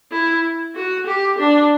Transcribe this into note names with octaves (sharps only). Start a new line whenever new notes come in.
E4
F#4
G4
D4